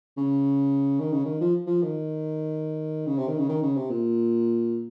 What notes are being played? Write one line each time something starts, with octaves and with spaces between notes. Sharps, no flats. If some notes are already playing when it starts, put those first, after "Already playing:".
C#3
D#3
C#3
D#3
F3
F3
D#3
C#3
C3
D#3
C#3
D#3
C#3
C3
A#2